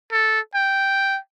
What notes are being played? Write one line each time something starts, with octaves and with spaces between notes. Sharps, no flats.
A4
G5